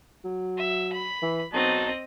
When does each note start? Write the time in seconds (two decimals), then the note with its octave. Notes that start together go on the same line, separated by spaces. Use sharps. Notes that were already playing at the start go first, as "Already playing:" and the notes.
0.25 F#3
0.57 E5
0.93 B5
1.22 E3
1.54 B1 F#3 C4 D#4 D#5 A5